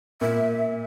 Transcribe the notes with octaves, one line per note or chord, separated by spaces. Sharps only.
A#2 E5